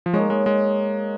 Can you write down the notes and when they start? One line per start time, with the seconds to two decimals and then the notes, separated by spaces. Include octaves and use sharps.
0.06 F3
0.13 G#3 A#3 D#4 C#5
0.30 G#3
0.46 G#3